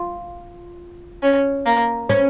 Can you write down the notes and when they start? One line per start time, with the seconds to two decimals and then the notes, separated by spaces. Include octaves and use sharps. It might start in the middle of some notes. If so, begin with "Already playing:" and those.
Already playing: F4
1.23 C#4
1.66 A#3
2.09 C#4